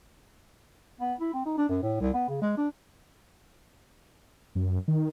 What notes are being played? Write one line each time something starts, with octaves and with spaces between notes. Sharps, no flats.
B3
E4
C4
D#4
D4
F#2
A2
C2
B3
C#3
G#3
D4
F#2
D#3